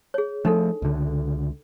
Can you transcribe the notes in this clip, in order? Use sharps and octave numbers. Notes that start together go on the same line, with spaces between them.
G#4 C#5
F3 A3 D4 D#4 A4
C#2 D3